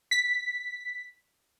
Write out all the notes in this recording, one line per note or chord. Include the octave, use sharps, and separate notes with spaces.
B6